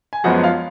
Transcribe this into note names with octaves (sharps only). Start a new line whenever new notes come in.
G#5
F#2 F3 G#3 B3 F#4 F#5
F4 F5